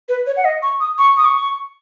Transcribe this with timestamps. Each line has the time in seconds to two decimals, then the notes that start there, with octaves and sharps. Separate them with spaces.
0.09 B4
0.27 C#5
0.37 F#5
0.45 D#5
0.62 C#6
0.80 D#6
0.98 C#6
1.17 D#6
1.25 C#6